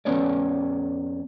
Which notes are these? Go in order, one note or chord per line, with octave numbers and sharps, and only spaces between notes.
F2 B3 C#4 C#5 D5